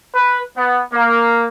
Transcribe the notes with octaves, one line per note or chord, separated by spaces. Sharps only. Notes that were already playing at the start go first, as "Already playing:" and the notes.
B4
B3
A#3